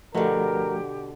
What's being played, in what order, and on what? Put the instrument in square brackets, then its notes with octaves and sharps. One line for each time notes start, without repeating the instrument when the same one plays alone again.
[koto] B2 D3 [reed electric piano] F3 A3 F#4 [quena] G4 [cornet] A#4